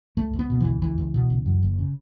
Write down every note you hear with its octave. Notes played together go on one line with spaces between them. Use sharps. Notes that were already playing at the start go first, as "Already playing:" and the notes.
C#2 A3
C#2
B3
B2
C#2 E3
C#2 E3
C#2
B2
C#2
F#2
F#1
C#3